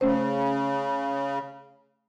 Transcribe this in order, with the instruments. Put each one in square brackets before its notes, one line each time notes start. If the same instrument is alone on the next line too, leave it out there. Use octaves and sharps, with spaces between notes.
[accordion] C#3 [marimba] A3 C#4 C5